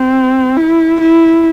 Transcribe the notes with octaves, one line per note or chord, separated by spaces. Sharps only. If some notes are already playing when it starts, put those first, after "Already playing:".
Already playing: C4
E4
E4